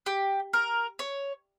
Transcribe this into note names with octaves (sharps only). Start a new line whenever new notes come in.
G4
A#4
C#5